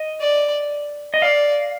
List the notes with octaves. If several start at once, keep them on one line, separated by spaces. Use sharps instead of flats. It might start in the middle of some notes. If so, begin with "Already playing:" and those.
Already playing: D#5
D5
D#5
D5 F5